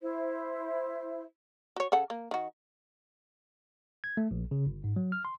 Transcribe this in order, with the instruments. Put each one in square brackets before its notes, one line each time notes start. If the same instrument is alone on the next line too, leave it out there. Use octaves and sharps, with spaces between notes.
[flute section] E4 C5
[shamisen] F#4 C#5
C#3 A4 F#5
A#3
D#3 F#4
[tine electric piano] G#6
A3
A#1
C#3
G1
G#2
F#3
F6
C6